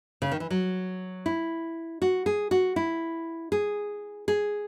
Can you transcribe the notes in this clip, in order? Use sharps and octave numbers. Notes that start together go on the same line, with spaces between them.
C#3
D#3
E3
F#3
E4
F#4
G#4
F#4
E4
G#4
G#4